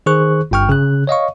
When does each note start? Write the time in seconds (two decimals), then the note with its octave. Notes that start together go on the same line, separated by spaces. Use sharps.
0.06 D#3 G#4 C5 C#6 F#6
0.51 G1 G2 G5 C#6 F6
0.69 C#3 F#6
1.07 C#5 D#5 F5 C#6